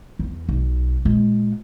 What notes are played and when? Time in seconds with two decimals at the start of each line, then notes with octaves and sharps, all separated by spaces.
0.19 E2
0.49 B1
1.05 A#2 G#3